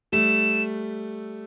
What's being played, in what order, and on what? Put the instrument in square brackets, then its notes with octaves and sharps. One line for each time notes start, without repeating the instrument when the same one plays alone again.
[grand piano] G3 A3 [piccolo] E7